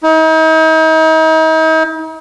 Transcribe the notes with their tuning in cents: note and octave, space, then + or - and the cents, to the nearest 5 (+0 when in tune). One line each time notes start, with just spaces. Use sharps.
D#4 +40